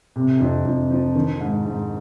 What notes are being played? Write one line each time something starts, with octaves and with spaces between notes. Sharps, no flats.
C3
F2
F2
F3
D#3
G#2
G#2